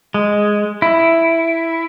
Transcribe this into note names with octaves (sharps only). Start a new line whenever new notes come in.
G#3
E4